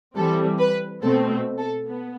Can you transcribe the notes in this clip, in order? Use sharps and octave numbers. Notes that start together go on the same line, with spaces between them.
E3 G3 C4 A4
B4
B2 A3 C4 A4
A4
B3